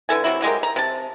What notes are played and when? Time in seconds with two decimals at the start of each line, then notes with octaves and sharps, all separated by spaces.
0.09 D3 E3 A4 G#5
0.24 C3 F#3 E4
0.42 F#3 G#3 G4 A#4
0.63 A#5
0.76 C3 A5